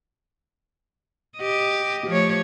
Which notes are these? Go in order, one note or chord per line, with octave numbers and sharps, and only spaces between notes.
G4 D#5
F3 A3 C#5